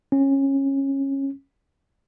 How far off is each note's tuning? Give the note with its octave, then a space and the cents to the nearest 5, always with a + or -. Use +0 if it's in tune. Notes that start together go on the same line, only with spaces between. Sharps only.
C#4 -20